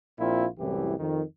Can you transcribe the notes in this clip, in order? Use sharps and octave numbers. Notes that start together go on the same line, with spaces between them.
A#1 A#2 C4 E4 F4
C2 F#2 A2 E3 G4
F2 D#3